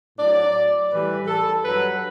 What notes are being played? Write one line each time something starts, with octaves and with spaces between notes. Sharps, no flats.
A2 F#3 D5
A2 E3 G3 B4
A4
G2 F#3 B4